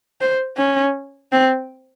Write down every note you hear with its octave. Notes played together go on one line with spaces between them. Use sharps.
C5
C#4
C4